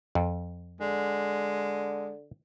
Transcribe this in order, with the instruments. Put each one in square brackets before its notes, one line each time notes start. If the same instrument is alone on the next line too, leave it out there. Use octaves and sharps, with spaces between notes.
[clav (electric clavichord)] F2
[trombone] D3 [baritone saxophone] G#3